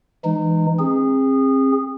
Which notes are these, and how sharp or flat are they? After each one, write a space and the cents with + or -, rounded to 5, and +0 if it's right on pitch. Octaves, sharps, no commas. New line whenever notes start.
E3 +5 G#3 +0 D#4 -25
C4 +35 G#4 -25